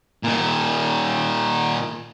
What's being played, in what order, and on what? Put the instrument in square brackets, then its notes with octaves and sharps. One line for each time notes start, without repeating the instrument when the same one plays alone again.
[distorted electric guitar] A#2 D#3